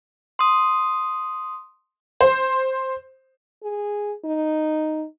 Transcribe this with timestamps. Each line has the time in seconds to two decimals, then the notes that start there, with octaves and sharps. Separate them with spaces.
0.39 C6 D#6
2.21 C5
3.63 G#4
4.25 D#4